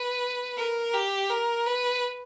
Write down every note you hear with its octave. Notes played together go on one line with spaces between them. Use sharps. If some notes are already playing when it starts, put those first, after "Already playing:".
Already playing: B4
A#4
G4
A#4
B4